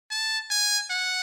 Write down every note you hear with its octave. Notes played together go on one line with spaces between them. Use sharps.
A5
G#5
F#5